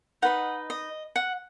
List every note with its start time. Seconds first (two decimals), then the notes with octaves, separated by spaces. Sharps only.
0.22 D#4 B4 D#5 F#5
0.70 D#5
1.16 F#5